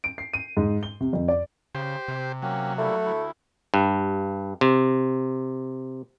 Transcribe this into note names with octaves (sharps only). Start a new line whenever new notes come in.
D7
C7
D#7
G#2
G7
C3
F2
D5
C#3 G4 C5
C3
F#3 A#3 C4 C#4
G3 A3 A#3 E4
D2 E4
G2
C3